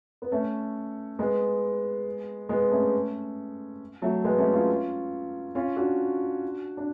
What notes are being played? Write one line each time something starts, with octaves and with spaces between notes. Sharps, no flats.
B3
A3 C#4
G#3 B3
G#3 B3
A3 C#4
F#3 A3
G#3 B3
A3 C#4
C#4 F4
C#4 F4
D4 F#4
D4